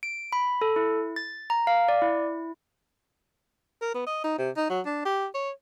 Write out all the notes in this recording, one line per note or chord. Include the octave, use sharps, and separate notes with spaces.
D7
B5
A4
E4
A6
A#5
F5
D5
E4
A#4
B3
D#5
D#4
C3
D#4
F#3
D4
G4
C#5